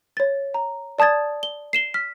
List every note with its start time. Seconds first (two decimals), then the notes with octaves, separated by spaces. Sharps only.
0.17 C#5 A6
0.54 A#5
0.99 D5 A5 D#6 G#6 A6
1.43 G7
1.73 C7 E7 G7
1.94 F6 B6